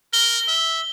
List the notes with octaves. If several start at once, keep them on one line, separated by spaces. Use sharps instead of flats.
A#4 G7
E5